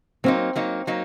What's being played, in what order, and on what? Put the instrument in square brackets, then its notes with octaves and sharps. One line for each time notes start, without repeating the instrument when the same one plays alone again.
[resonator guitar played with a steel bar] F#3 A#3 D#4 [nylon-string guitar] C4
[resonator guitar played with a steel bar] F#3 A#3 D#4
F#3 A#3 D#4